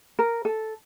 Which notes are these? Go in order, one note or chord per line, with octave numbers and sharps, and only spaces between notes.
A#4
A4